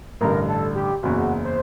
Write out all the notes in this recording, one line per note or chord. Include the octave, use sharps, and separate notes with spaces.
A1 G2 D3 A#4
A4
G4
F#1 E2 C#3 F#4
C5